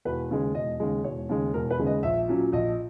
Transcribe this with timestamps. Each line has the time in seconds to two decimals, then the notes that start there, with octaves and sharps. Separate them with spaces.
0.05 E1 B4
0.30 D#2 C#3 G#3
0.54 E1 D#5
0.80 D#2 C#3 G#3
1.04 E1 C#5
1.29 D#2 C#3 G#3
1.54 E1 A#4
1.71 B4
1.79 D#2 C#3 G#3
1.86 D#5
2.03 A#1 E5
2.28 A#2 F#3 C#4
2.52 A#1 D#5